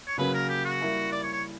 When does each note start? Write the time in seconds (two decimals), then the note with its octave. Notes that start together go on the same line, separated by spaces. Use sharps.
0.07 C#5
0.18 C#3 F#3 A#3 C#4 B4
0.34 A#4
0.49 G4
0.65 F#4
0.81 G3 A#3 E4 A#4 E5
1.12 D5
1.23 C#5
1.33 C#5